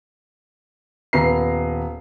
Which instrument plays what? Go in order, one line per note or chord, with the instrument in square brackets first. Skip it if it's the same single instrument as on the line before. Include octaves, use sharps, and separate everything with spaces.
[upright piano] D#1 B3 A#5 C7